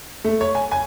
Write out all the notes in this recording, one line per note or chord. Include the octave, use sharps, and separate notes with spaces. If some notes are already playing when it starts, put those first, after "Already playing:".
A3
C#5
G#5
G#5